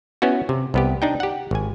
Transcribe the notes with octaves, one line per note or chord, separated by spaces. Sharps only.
B3 C#4 E4 F#4
C3
C2 B3 G4
D4 D#4 G5
G4 F#5
G#1 G#5